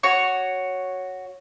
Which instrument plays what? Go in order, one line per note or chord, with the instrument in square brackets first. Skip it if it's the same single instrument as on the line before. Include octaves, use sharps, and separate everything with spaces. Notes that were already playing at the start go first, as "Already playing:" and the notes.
[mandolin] F#4 C#5 C#6